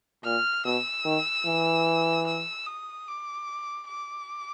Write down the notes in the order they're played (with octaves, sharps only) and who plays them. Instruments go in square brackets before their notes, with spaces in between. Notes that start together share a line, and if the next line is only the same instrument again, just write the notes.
[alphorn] A#2 [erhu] F6
[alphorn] B2 [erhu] E6
[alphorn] D#3
E3
[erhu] E6
D#6
D6
D6